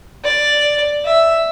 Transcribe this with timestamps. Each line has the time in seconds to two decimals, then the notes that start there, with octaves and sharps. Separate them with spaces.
0.24 D5
1.05 E5